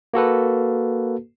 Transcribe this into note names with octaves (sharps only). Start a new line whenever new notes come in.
A#3 F#4 A4 B4